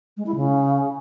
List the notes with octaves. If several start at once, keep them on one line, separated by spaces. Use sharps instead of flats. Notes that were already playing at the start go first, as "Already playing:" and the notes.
G#3
E4
C#3